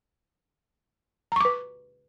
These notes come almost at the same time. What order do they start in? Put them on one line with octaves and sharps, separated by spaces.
A#5 C#6 D6 B4